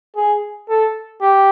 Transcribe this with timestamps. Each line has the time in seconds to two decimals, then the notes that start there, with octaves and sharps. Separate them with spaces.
0.16 G#4
0.69 A4
1.22 G4